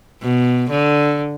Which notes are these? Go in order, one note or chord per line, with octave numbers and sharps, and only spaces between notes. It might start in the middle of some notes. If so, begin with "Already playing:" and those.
B2
D3